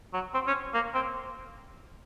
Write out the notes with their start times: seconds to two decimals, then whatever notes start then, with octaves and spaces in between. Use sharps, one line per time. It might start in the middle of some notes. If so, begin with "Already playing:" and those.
0.14 F#3
0.34 C4
0.47 C#4
0.74 A#3
0.94 C4